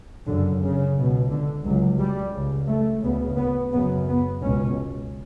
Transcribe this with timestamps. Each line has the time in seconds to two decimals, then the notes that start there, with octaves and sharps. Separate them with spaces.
0.26 F#2 D3
0.31 C#3
0.61 C#3
0.95 C#2 B2
1.31 D3
1.65 C#2 C#3 F#3
1.99 G3
2.34 C#2 C#3
2.68 A3
3.03 D2 C#3 B3
3.38 B3
3.72 F#2 C#3 B3
4.07 B3
4.41 C#2 B2 C#4